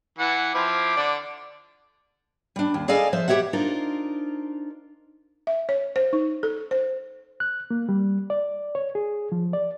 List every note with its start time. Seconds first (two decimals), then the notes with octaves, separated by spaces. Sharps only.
0.19 E3 F#5
0.54 F3 C4 E4 D6
0.96 D3 D5
2.56 G3 D4
2.74 D#2
2.88 G#4 A4 D5 D#5 F5 G#5
3.13 F3 C5 E5
3.28 G4 A4 C#5 E5 F#5
3.53 D4 D#4 F4 A#4 C5
5.47 E5
5.69 C#5
5.96 C5
6.13 D#4
6.43 A4
6.71 C5
7.40 F#6
7.71 A#3
7.89 G3
8.30 D5
8.75 C#5
8.95 G#4
9.32 F3
9.53 D5